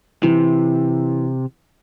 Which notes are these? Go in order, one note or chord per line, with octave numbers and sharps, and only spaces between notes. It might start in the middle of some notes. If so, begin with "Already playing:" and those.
C3 E3